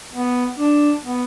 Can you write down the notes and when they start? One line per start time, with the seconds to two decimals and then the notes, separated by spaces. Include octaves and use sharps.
0.13 B3
0.59 D4
1.04 B3